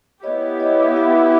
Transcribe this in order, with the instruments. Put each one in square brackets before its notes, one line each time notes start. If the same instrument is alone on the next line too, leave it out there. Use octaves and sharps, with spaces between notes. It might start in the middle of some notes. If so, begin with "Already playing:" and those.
[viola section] B3 E4 G4 [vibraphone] C#5 D#5
[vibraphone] C#5 D#5
E5
F5
E5 F#5